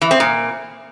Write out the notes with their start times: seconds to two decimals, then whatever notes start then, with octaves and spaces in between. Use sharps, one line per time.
0.02 E3
0.11 C4
0.20 A#2